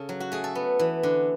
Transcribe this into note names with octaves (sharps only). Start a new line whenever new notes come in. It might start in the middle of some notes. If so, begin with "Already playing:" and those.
Already playing: C#3 A4
F#3
F#4
A3 G#4
A4
B3
E3
D3